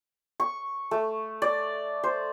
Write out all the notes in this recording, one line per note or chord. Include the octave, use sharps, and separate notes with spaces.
C#6
A3
D5
C5